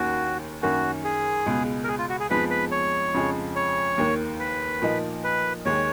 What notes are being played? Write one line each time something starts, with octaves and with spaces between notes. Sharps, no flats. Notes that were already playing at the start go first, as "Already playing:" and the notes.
Already playing: D#2 D#3 A#3 C#4 F#4
F#2 D#3 A#3 C#4 F#4
G#4
C#2 B2 G#3
A#4
G#4
F4
F#4
G#4
F2 F3 G#3 B3 D#4 B4
B4
C#5
F2 C#3 F3 G#3
C#5
D#2 D#3 A#3
B4
A#2 F3 A#3 D#4
B4
D#2 D#3 G#3 C#5